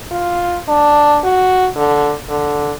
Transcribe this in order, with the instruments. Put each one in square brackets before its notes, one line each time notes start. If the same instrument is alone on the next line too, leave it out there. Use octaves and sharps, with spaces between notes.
[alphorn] F4
D4
F#4
D3
D3